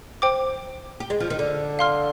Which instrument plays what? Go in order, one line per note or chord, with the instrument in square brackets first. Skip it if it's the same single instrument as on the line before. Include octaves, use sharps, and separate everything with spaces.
[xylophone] C5 G5 D6
[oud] G4
G#3
F3
D#3
D3
[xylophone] F5 C6 F6